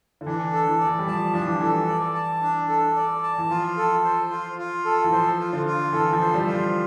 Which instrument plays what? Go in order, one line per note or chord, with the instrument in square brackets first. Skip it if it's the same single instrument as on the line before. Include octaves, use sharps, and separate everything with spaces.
[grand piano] D3
[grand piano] E3 [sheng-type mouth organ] D4
[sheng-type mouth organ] A4
[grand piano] E3
[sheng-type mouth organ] D5
[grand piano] E3
G3
[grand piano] F3 [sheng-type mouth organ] A5
[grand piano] F3 [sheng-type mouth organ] D4
[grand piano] E3
F3
[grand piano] E3 [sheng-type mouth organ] A4
[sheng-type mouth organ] D5
A5
D4
A4
D5
A5
[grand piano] E3
[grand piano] F3 [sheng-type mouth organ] F4
[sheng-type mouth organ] A4
C5
F4
F4
A4
[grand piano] E3
[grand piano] F3 [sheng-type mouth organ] C5
[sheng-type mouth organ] F4
[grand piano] D3
[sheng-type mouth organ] F4
[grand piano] E3 [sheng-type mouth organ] A4
[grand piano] F3
[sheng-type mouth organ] C5
[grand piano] G3
[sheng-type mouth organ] F4
[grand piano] F3